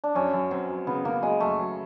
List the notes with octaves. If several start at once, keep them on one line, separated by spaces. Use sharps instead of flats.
D4
F#2 C#4
F#2
F#3 C4
F#3
C#3 B3
C#3 A#3
F#3 G#3
F#2 A3
F#3